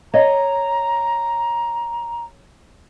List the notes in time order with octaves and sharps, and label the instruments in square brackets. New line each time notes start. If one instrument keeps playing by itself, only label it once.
[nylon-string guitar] C#5 D#5 [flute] A#5